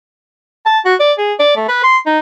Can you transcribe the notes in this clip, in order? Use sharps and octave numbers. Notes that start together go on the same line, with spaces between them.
A5
F#4
D5
G#4
D5
A3
B4
C6
D#4